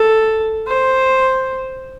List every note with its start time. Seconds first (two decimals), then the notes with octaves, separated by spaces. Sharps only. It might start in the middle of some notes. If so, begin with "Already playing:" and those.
Already playing: A4
0.68 C5